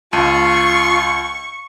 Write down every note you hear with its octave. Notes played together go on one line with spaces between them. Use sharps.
C#2 F4 A5 C#6 D#7